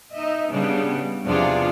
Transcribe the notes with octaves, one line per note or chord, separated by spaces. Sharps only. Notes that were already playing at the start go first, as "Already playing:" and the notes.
D#4 D#5 E5
C#3 G3 B3 D4
E2 C3 F3 D4 F4 G#4